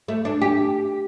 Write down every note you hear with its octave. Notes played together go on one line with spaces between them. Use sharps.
A3
D4
G4